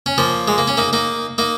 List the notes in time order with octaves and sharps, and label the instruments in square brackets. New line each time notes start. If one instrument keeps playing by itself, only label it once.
[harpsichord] C#4
F3 A#3
G#3
A#3
C#4
A#3 D#4
A#3 D#4
A#3 D#4